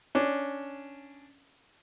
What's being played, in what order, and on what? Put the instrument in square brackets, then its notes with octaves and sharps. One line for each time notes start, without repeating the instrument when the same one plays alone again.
[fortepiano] C#4 D4